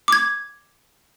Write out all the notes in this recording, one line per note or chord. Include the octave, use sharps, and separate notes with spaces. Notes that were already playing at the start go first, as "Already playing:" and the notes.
D6 G#6